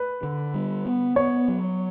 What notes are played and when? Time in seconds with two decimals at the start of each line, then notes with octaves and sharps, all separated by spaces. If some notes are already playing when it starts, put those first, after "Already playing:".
Already playing: B4
0.23 D3
0.54 G3
0.86 B3
1.16 B3 C#5
1.48 F#3